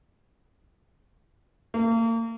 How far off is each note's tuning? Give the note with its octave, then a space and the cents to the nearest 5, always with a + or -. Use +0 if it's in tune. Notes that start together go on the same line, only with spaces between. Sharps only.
A#3 -35